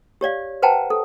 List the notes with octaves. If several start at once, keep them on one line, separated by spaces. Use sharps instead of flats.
G4 C#5 D5 F5
B4 C5 F#5 G5 A5 A#5
A4